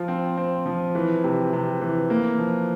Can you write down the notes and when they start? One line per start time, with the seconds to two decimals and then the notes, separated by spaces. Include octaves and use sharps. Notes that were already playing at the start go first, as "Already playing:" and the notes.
Already playing: F3 F4
0.08 C4
0.37 C4
0.66 F3
0.95 E3
1.24 C3
1.53 C3
1.81 E3
2.10 A#3
2.39 F3